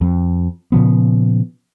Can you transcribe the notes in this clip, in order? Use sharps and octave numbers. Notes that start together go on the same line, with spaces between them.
F2
A#2 C#3 F3 B3